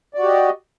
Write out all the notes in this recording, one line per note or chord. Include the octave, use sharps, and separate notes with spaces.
F#4 G4 D5 D#5